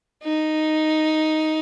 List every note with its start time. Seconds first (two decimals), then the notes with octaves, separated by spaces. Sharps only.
0.24 D#4